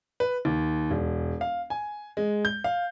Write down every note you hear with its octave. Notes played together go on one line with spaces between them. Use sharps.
B4
D#2
E1
F5
G#5
G#3
G6
F5